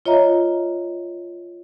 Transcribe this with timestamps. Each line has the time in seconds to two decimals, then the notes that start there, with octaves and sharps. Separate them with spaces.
0.06 F4 C#5 D#5 E5 A#5